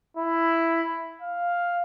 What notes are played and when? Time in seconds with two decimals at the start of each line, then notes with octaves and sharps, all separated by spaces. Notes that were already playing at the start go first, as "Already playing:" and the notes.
0.17 E4
1.22 F5